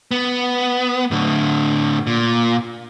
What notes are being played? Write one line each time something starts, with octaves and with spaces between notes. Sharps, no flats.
B3
A2 D3
A#2